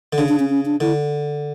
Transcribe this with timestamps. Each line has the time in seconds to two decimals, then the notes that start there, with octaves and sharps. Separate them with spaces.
0.13 D3
0.18 C#3 D4
0.29 D4
0.39 C#4
0.49 C#4
0.65 D4
0.80 D3 E4